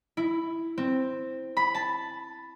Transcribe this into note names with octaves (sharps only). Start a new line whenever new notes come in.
E4
C4
B5
A5